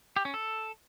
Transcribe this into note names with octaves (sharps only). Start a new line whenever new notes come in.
G4
C#4
A4